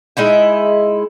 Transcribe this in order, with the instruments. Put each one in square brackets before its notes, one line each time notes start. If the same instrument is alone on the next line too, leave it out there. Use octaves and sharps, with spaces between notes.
[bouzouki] G#3 D#4 E4 E5